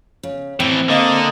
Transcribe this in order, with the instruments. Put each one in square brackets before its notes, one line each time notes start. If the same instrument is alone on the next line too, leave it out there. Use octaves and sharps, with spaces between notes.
[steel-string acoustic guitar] C#3
[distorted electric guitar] A2 E3 [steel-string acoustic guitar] C4
[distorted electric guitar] D3 [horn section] A#3 D#5